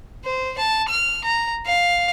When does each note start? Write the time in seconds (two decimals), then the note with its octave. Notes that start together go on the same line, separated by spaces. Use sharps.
0.24 C5
0.58 A5
0.89 F6
1.24 A#5
1.65 F5